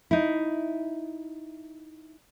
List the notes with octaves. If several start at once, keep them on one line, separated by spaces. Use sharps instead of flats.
D#4 E4